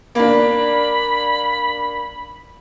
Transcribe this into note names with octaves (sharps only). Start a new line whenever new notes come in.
A#3 D4 B5